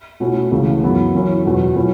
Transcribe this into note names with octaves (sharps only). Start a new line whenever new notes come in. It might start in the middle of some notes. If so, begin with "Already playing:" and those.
B2 A3 C#4 E4
C#2 C#3 E3 A3
F#2 E3 B3 E4
F#2 E3 C#4 E4
E2 B2 F#3
B2 F#3 C#4 E4